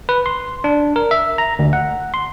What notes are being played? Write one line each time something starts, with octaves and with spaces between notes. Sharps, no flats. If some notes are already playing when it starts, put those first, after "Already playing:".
B4
C6
D4
A#4
E5
A#5
D2
F#5
C6